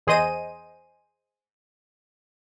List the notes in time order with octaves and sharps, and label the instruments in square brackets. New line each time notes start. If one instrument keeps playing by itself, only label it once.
[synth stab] E2 G#4 C5 D#5 D#7